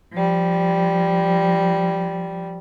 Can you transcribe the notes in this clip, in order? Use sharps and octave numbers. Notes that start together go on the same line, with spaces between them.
F3 G3